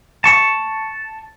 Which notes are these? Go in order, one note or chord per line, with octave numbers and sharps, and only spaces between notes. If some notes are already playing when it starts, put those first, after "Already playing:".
A5 C#6